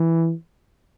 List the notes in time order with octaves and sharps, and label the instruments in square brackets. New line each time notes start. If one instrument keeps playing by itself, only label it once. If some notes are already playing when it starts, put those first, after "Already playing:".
Already playing: [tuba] E3